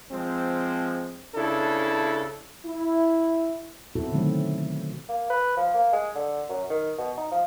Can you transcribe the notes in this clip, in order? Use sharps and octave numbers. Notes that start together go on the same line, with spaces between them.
F3 G#3 C4
C#2 C#3 D4 E4 A4
E4
B2 C4 E4 F#4 A4
D3 D#3 F#3 A3 C4
A#3
B4
F3
A#3
G#3
D3
F#2
D#3
B2
D#4
F3